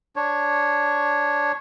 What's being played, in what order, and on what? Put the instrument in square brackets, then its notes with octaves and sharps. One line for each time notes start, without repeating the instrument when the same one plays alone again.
[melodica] D4 C#5